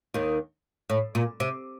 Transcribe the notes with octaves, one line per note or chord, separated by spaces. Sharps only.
D#2 D#3
A2
A#2
C3